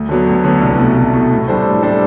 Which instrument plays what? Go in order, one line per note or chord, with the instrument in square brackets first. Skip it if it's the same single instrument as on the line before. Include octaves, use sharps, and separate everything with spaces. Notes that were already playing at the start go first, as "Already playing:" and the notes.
Already playing: [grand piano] D2
D3 F#3 B3
D2
D3 F#3 B3
C2
B2 A3
C2
B2 A3
A2
G3 D4 A4 C5
A2
G3 D4 A4 C5